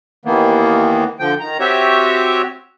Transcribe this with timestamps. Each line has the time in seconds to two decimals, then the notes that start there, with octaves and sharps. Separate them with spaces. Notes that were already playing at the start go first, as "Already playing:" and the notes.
0.25 D#2 D#3 E3 A#3 B3
1.19 D3 F3 G5
1.40 D#3 A#5
1.59 C4 F#4 G4 C#5 E5